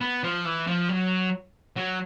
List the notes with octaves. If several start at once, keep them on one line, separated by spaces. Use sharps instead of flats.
B3
F3
E3
F3
F#3
F#3